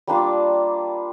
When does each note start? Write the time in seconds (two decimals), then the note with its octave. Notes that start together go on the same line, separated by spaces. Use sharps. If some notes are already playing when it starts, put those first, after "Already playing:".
0.07 G3 A#3 D4 F4